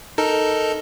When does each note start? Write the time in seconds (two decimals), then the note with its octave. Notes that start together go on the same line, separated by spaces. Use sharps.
0.18 D#4 A4 A#4